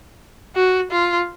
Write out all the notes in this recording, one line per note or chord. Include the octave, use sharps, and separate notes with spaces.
F#4
F4